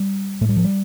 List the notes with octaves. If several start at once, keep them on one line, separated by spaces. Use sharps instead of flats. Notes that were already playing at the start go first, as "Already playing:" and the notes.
Already playing: G3
A2 A3
G3
F3
G3